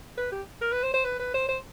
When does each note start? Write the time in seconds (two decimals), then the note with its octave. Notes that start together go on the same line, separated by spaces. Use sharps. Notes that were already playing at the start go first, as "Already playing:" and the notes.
0.18 B4
0.32 G4
0.61 A#4
0.72 B4
0.83 C5
0.94 C5
1.05 B4
1.19 B4
1.34 C5
1.49 C5